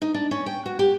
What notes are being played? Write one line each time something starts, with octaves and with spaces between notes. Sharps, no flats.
D#4
D4
C#4
G5
F#4
G4